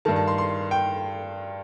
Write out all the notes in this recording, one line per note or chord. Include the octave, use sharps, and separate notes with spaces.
G2 D#3 A5
A5
C6
C6
G5